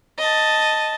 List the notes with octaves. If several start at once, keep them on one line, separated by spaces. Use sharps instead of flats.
D#5 A5